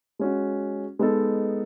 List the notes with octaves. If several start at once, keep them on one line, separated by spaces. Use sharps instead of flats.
G#3 C#4 F#4
G#3 B3 D#4 A4